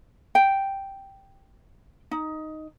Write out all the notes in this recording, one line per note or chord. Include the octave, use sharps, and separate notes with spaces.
G5
D#4